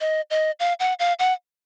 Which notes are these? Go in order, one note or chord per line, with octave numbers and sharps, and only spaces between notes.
D#5
D#5
F5
F#5
F5
F#5